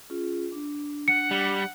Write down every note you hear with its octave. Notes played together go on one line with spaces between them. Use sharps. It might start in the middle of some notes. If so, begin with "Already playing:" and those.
C#4 F4 G#4
D4
F#5 C#7
G3